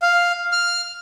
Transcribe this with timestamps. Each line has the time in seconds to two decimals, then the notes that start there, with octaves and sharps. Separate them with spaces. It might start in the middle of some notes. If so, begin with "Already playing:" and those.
0.02 F5
0.52 F6